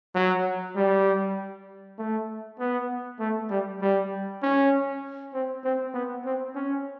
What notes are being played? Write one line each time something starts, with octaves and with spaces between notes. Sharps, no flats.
F#3
G3
A3
B3
A3
G3
G3
C#4
C4
C4
B3
C4
C#4